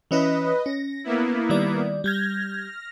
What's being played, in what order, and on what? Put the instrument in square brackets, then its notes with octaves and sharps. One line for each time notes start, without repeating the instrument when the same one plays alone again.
[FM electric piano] E3 C#4 E4 [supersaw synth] B4 D#5
[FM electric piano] C#4 [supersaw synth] A#6
[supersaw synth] A#3 B3 E4
[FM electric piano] D#3 G3 D5
[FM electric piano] G3 G6 G#6 [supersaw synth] F6 A#6